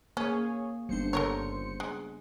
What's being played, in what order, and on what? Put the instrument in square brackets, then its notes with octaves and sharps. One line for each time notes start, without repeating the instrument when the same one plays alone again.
[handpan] A#3 [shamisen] C#4 [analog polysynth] G#4 C#5
[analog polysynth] G1 C5 C#7 [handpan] G3 B3 D4
[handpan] C#3 [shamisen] A4 A#4 C#5
[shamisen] G#3